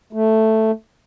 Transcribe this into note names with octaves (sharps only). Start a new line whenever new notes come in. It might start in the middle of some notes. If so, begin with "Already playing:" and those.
A3